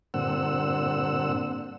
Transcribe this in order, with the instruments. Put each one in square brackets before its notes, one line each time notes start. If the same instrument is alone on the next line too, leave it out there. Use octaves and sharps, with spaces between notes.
[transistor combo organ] G2 A#2 D3 C4 F#5 E6